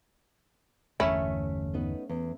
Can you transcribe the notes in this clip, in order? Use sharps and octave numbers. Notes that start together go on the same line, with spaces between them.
G1 E2 D3 A3 C#4 E4 A#4 E5
B3 D#4 B4
E2